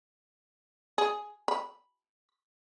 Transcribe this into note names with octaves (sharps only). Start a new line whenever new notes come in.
G#4
B5